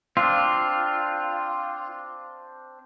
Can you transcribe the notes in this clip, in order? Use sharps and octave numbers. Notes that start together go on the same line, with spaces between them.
C4 D4 F4